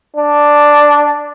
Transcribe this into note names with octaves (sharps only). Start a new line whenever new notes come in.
D4